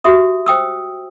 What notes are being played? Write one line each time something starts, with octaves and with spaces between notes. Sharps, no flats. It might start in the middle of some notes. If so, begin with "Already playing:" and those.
F#4 G4 E5 D#6
C5 G5 D#6 E6